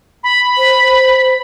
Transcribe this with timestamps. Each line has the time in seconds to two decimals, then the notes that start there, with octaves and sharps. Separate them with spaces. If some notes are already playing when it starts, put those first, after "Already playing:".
0.24 B5
0.57 C5